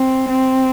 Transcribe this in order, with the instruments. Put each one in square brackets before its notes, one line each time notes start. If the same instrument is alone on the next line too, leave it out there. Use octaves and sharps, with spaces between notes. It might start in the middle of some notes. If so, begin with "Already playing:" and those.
Already playing: [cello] C4
C4